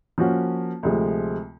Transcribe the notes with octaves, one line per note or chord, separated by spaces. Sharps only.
F3 A#3 C#4 F#4
D2 C3 F3 G#3